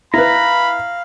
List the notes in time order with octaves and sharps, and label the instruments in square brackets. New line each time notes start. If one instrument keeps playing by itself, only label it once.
[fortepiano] E4 B4 [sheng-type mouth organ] F5 [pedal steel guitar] A#5 [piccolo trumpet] B5